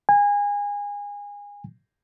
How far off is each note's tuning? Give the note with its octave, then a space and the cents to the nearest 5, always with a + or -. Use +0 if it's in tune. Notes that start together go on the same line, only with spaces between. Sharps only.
G#5 -25